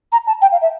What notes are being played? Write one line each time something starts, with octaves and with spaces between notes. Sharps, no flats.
A#5
A5
G5
F5
E5